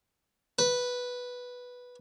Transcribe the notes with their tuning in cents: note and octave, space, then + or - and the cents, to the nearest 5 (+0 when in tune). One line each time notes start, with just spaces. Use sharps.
B4 -5